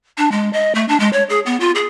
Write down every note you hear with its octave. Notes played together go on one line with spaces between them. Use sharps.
D4
G#3
D#5
A3
D4
G#3
C#5
G#4
B3
F4
G#4